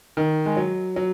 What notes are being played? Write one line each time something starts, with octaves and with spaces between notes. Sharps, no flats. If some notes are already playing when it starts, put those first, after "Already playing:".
D#3
G#3
F#3
F#3